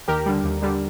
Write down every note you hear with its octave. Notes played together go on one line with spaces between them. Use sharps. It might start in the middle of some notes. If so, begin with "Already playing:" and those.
D#2 G4 A#4
D3 G3
D#2
D3 G3